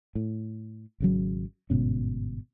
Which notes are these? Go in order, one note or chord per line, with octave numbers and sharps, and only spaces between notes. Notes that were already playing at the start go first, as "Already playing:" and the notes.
A2
G#1 C#3 F#3
G1 G#2 B2 C#4